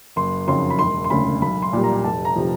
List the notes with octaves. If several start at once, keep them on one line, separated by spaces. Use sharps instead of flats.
F#1 C6
F2 C#3 F#3 C6
B5
E1 C6
C6
D2 C#3 B5
B1 B5
C6
A#2 G3
A#5
F1 A5
A#5
C3 F3